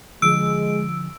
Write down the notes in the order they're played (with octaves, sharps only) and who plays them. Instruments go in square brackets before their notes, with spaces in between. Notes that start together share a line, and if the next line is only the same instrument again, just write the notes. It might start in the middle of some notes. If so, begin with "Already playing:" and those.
[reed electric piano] D3 F3 [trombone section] G#3 [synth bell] E6 D7